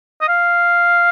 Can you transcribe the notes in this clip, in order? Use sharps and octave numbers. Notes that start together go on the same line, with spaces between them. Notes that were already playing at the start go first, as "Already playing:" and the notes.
D#5
F5